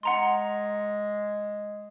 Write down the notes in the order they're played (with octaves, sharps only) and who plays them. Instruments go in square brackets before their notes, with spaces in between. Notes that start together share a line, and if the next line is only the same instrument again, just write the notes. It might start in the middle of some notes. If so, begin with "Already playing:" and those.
[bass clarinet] G#3 [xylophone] F#5 A#5 C6